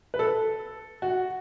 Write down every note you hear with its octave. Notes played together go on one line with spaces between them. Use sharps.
B4
A4
F#4